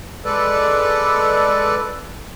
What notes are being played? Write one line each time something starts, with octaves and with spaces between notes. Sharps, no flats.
G#3 A4 B4 D5